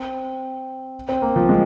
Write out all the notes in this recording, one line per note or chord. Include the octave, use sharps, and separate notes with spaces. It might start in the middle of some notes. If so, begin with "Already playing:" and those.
Already playing: C4
C4
A#3
F3
G#3